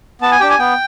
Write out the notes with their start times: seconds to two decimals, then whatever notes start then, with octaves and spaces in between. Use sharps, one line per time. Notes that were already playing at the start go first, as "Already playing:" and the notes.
0.22 B3 A5
0.32 G#5
0.40 D4 G4 G5
0.50 G#5
0.59 B3 G5